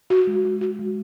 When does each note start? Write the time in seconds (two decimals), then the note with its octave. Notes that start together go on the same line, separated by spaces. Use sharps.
0.10 F#4
0.27 G#3
0.45 F#4
0.61 F#4
0.79 G#3